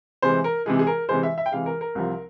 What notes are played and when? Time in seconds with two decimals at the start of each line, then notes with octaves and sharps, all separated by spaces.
0.22 C3 E3 G#3 C5
0.44 A#4
0.66 C3 E3 G#3 G#4
0.79 G#4
0.87 A#4
1.09 C3 E3 G#3 C5
1.23 E5
1.38 E5
1.46 G5
1.52 C3 E3 G#3 F5
1.66 A#4
1.81 A#4
1.95 C2 C3 F3